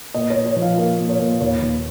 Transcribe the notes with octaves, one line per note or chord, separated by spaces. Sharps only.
A#2 D#5
C#5
A#2
C#5
F3
F5
A#3 F5
A#2
C#5
A#2
D#2 C#5
D#2